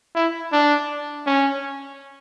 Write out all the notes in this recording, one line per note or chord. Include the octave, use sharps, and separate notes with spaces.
E4
D4
C#4